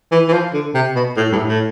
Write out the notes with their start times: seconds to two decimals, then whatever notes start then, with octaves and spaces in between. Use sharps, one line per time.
0.12 E3
0.28 E3
0.32 F3
0.53 D3
0.74 C3
0.95 B2
1.16 A2
1.32 G2
1.37 A2
1.48 A2